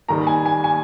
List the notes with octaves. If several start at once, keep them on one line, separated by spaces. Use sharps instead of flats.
D#2 D#3 G3 A#5
G#5
G#5
G#5